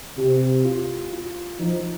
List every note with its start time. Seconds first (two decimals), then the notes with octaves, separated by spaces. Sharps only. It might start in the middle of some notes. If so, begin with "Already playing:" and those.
0.17 C3 G4
0.65 F4
1.12 F4
1.59 F3 D#4